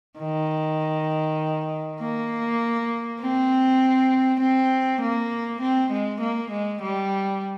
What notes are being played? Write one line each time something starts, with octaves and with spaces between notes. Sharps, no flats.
D#3
A#3
C4
C4
A#3
C4
G#3
A#3
G#3
G3